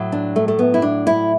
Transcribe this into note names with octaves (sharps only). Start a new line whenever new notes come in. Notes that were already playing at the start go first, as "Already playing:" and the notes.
Already playing: A2 F#3
D4
A3
A3
B3
E4
D4
E4